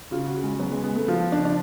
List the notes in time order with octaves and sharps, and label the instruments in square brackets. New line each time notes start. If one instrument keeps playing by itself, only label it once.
[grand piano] C#3 [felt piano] F4
[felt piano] F#4
[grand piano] C#3
[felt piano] G#3
[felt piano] F#3 [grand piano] B3
[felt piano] G#3
[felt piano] G#3 [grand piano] B3
[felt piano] A3
[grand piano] F3 [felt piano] F4
[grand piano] C#3 [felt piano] D4
[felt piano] D4